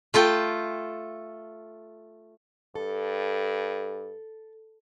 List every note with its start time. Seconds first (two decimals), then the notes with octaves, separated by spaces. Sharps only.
0.14 A3 F4 A4 G5
2.75 G2 A4